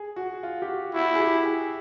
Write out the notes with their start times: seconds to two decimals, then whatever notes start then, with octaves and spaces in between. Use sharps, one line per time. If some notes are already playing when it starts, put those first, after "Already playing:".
Already playing: G#4
0.16 F#4
0.43 F4
0.62 G4
0.68 F#4
0.94 E4 F#4
1.15 G#4
1.20 G4
1.45 G#4